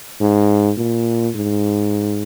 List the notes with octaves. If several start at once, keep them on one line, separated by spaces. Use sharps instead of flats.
G#2
A#2
G#2